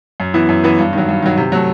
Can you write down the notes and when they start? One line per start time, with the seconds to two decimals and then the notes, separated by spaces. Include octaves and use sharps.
0.20 F#2
0.34 E3 B3 E4
0.49 F#2
0.63 E3 B3 E4
0.79 G2
0.93 D#3 F#3
1.09 G2
1.22 D#3 F#3
1.37 C3
1.52 F#3 A3